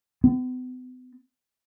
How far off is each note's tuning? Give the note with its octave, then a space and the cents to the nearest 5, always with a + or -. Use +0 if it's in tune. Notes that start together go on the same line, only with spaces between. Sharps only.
B3 +40